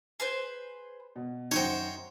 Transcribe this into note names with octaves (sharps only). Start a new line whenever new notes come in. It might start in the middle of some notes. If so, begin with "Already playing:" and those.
G#4 B4 C5
B2
F#2 D#3 D#4 F#4 C5 C#5 G5